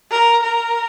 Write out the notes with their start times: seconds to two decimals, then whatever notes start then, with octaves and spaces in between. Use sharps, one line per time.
0.11 A#4
0.43 A#4